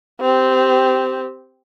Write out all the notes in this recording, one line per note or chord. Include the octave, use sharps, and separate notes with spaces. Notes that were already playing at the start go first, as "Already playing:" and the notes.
C4 G4